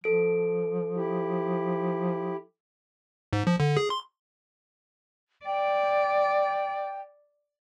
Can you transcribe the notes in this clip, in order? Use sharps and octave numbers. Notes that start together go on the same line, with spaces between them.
F3 A4 D7
E4 G4
G#2
F3
D3
G#4
C6
D5 G5